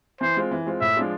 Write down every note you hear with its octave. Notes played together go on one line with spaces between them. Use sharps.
E3 C5
G#3 C4 F4
E3
G#3 C4 F4
A2 E5
F3 G#3 D4 F4